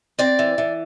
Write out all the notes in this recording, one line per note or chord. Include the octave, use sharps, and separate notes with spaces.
C4 D5
E3
E3